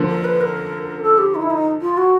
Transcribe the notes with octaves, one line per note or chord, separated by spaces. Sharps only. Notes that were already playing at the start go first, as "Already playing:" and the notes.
Already playing: D3 F3 A#3
A#4
B4
A#4
A4
G4
D#4
E4
D#4
F4
F#4